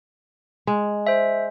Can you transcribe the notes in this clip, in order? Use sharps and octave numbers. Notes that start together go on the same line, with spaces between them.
G#3
C5 E5